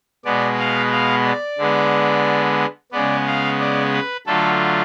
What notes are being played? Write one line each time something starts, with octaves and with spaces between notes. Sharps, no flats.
B2 G#3 B3 D5
F5
F5
D5
D3 G#3 B3
C#3 G#3 B3 D5
F5
D5
B4
D3 F#3 A3 F4 A4